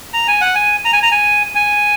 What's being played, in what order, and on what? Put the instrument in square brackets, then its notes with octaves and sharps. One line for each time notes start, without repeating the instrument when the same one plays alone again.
[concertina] A#5
G#5
F#5
G#5
A#5
G#5
A#5
G#5
G#5